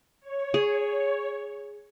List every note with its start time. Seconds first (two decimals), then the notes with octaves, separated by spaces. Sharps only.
0.20 C#5
0.54 G#4